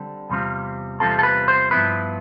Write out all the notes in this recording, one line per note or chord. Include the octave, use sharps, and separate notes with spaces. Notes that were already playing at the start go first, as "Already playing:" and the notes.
Already playing: D3 G3 C4
E2 C3 G3 C4 F4
E2 C3 G3 C4 F4 A4
A4
B4
C5
G2 F3 B3 E4 B4